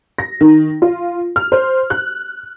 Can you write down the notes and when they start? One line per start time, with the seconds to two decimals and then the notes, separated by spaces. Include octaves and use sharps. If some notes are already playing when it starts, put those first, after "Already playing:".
0.18 A#6
0.41 D#3
0.82 F4
1.36 F6
1.52 C5
1.90 F#6